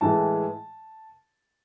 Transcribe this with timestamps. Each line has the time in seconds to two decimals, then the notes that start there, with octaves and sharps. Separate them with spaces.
0.01 A2 E3 G#3 A5